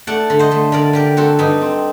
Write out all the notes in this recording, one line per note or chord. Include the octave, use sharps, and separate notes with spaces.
A3 D5 F#5
D3
C5 D#5
A3
D3 A#4 D5
D3 G4 A#4
C4 F#4 A4
G2 D#4
C4